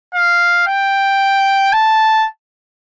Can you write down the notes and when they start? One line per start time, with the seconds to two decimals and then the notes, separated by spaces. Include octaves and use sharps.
0.15 F5
0.68 G5
1.73 A5